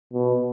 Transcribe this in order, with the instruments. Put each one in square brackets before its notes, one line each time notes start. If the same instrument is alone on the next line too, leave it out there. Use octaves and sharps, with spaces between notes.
[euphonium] B2